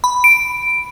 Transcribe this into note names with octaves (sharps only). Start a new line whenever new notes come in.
B5
D7